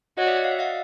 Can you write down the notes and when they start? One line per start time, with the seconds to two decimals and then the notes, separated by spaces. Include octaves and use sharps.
0.18 F#4 C#5 D#5
0.27 D5 E5
0.37 F#5
0.44 F5
0.51 E5
0.59 D#5 F5